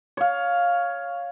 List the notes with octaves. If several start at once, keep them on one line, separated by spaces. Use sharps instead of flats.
C#5 F5